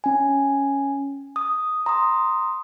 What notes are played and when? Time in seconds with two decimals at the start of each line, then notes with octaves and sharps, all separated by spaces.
0.04 C#4 G#5
1.36 D#6
1.86 A#5 C6 D#6